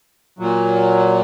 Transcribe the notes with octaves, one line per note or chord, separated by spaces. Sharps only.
A#2 F#3